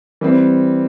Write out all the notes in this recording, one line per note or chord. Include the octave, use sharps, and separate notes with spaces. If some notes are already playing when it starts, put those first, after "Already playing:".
E3 G3 C4